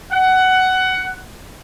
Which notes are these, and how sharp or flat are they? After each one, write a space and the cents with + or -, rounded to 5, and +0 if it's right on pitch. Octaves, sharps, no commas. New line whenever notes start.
F#5 +15